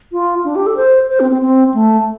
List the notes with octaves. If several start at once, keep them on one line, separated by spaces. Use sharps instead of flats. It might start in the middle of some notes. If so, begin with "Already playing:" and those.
F4
D4
G4
A4
C5
C5
C4
C4
C4
A3